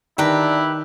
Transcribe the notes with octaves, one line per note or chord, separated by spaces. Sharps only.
D#3 D4 E4 G4 B4 A#5